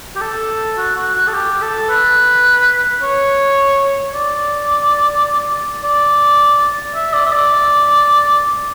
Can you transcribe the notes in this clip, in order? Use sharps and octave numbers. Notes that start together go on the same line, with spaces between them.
G4
A4
F#4
F#4
F#4
A4
G4
A4
B4
C#5
D5
D5
E5
D5
E5
D5